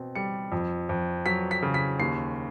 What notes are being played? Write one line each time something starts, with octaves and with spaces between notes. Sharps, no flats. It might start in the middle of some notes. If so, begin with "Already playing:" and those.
Already playing: B2 C4
G3 C#7
F2
F2
F#3 B6
B6
C#3
B6
D#2 C7